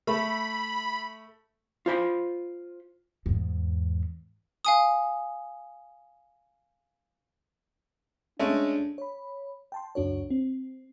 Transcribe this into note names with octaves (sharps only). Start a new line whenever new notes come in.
A3 E5 B5
F4 C5 B5
E2 G#2
F5 G#5 D#6
G#3 A3 C#4 D4
C#5 B5
G5 A5 C6
C#2 F#2 D4 F#4 C#5
C4